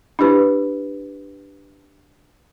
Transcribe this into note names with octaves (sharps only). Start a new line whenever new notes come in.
D4 E4 G4 B4